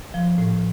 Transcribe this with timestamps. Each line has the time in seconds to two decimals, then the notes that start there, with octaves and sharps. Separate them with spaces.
0.14 F3
0.38 A2